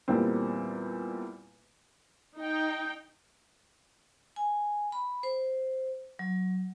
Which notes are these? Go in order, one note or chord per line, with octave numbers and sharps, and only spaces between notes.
E2 A#2 G3 A#3 C4
D#4 G5
G#5
B5
C5
F#3